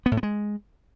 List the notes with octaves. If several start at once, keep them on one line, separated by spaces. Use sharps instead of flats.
B3
A2
B3
G#3